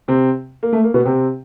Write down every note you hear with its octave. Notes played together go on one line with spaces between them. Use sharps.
C3 C4
A#3
A3
A#3
B2 B3
C3 C4